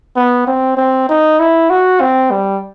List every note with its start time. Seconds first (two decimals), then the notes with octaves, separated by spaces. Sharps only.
0.16 B3
0.47 C4
0.77 C4
1.09 D#4
1.40 E4
1.70 F#4
2.01 C4
2.31 G3